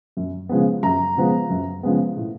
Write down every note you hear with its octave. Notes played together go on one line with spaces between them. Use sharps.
F#2
C#3 F3 G#3 B3
F#2 A#5
C#3 F3 G#3 B3
F#2
C#3 F3 G#3 B3
A2